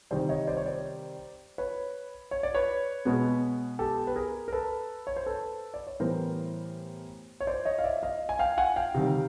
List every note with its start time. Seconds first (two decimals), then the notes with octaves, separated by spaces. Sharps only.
0.11 C3 D#3 G3 C5 D5
0.29 C#5 D#5
0.47 C5 D5
0.57 C#5
0.66 C5 D5
1.58 B4 C#5
2.31 C#5
2.43 D5
2.54 B4 C#5
3.05 B2 G#3 B3
3.79 G4 A4
4.07 B4
4.16 G#4 A#4
4.48 A#4
4.52 A4 B4
5.07 C#5
5.16 C5
5.26 A4 B4
5.74 D5
5.87 C#5
6.00 A2 E3 G3 B3 A#4 C5
7.40 C#5
7.47 C5 D5
7.65 C#5 D#5
7.79 F5
7.84 D5 E5
8.03 D#5 F5
8.29 G#5
8.39 F5 G5
8.58 F#5 G#5
8.76 F5 G5
8.94 C3 D#3 G3